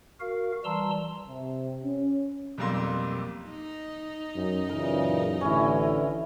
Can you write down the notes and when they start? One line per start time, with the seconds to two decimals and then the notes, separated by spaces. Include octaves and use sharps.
0.20 F#4 A#4 F5
0.64 E3 G3 A5 A#5 C6 E6
1.28 C3
1.84 C#4
2.58 B1 F2 G3 A#3 C6
3.49 D#4
4.35 F#2
4.69 F#2 A#2 C#3 E3 A#4
5.41 A1 D3 E3 C#4 E4